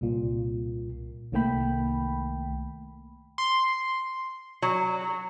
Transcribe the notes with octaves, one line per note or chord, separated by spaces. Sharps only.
C2 A#2
C2 D#3 A3 A#3 G5 B5
C6
F#3